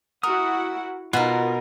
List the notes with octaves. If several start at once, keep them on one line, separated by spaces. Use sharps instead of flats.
E4 F#4 A#4 F#5 D#6
B2 D#4 F4 A#4 F5 F#5